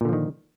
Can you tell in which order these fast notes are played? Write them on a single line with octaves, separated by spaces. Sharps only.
A#2 D3 F3 D#3